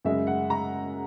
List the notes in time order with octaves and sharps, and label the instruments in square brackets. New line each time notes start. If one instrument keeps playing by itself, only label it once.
[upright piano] F#2 C#3 G#3 E5
F#5
A#5